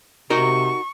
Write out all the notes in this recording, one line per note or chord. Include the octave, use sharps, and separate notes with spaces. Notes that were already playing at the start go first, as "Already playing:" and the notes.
C3 D#4 F#4 A#4 C#6